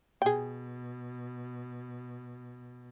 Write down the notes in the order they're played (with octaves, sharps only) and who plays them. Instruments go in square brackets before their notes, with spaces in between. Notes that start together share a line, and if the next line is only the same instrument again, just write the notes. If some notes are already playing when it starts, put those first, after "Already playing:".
[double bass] B2 [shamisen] G#4 G5